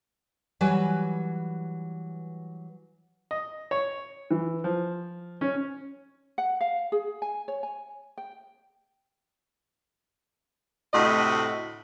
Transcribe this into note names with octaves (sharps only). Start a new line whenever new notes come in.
E3 F#3 G3 B4 G#5
D#5
C#5
E3
F3
C#4
F#5
F5
G#4
G#5
C#5
G#5
G5
D2 A2 C3 F#4 D#5